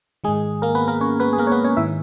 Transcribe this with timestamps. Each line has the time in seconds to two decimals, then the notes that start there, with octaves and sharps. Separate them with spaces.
0.24 G#2 D#3 G#3 G#4
0.62 A#3 A#4
0.75 B3 B4
0.88 A#3 A#4
1.01 C#4 C#5
1.20 B3 B4
1.33 G#4
1.38 A#3 A#4
1.47 C#5
1.52 B3 B4
1.64 C#4 C#5
1.76 G#2 D#3 E4 E5